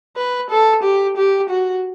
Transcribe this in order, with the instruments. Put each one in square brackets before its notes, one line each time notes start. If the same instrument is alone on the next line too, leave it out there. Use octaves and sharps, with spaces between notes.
[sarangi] B4
A4
G4
G4
F#4